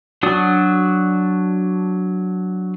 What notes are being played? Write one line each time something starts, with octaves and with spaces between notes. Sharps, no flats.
F#3 D4 F#4 D5 D#6